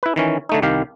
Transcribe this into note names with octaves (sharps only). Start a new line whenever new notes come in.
E4 B4
D#3 E3 C#4
D3 A3 D#4
C2 D#3 G4 F5